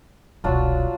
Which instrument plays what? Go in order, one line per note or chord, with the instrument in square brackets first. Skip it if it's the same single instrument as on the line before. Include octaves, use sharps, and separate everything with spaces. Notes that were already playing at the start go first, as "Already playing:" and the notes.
[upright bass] E1 C2 [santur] F#3 D4 F4